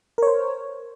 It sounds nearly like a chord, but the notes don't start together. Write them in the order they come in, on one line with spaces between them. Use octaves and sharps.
A#4 C#5 C5